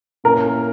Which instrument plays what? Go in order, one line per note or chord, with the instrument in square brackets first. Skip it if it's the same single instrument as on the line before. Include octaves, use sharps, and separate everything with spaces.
[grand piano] A#2 A#3 C#4 E4 [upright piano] A#4